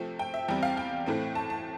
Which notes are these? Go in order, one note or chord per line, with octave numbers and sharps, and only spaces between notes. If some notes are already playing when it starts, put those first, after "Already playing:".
Already playing: C3 F3 A3 C4
G5
E5
E2 C3 G3 C4 G5
F5
G5
A2 E3 A3 C4
A5
A5